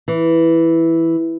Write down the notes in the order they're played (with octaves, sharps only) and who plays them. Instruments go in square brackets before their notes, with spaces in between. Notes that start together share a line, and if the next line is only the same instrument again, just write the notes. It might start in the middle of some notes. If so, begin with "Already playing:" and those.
[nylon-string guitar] E3